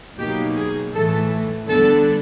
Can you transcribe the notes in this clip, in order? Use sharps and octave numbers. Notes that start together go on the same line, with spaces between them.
B2 F#3 A#3 D#4 G4
G#4
A2 E3 A3 A4
D3 G3 B3 D4 A4